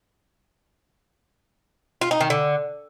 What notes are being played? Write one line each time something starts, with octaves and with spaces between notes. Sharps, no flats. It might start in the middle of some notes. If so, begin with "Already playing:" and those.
F4
D#4
D#3
D3